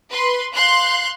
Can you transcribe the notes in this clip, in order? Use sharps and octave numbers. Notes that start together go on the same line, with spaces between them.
B4 C6
F5 C6 F#6 G6